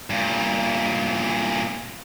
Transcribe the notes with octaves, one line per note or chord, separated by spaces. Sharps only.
G2 A#2